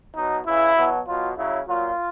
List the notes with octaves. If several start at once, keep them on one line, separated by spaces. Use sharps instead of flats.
B2 F#3 D#4
C#3 E3 E4
B2 F#3
B2 F#3 F4
C#3 F#3 E4
A#2 F#3 F4